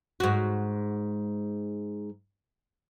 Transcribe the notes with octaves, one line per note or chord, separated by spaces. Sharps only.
G#2 F#4